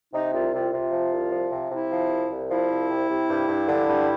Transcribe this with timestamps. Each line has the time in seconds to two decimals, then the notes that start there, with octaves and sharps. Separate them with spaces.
0.13 C3 D#4
0.32 C2 F4
0.52 C3 F4
0.72 C3 F4
0.92 F3
1.12 C2
1.31 F3
1.51 C3
1.71 C3 E4
1.91 F3
2.10 C2
2.30 C2
2.50 F3 E4
2.70 C2
2.89 C3
3.09 C3
3.28 G2
3.48 G2
3.68 D3
3.88 G2